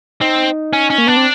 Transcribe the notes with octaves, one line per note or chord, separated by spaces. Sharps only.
C4 D#4
C#4
C#4
A#3
B3 D4
C4